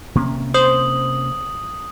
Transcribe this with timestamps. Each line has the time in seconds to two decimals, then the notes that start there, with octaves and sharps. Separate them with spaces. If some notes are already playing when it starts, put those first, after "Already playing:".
0.15 C3 A#3 C#4
0.54 C5 D#6 F#7